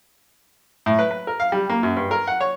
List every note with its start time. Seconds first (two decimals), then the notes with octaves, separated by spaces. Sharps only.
0.86 A2
0.99 B4
1.11 B4
1.27 A#4
1.40 F5
1.52 G3
1.70 A#3
1.83 F#2
1.96 G2
2.11 A#4
2.27 F#5
2.41 C#5